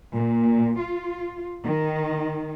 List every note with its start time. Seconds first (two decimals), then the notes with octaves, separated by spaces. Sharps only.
0.15 A#2
0.80 F4
1.65 D#3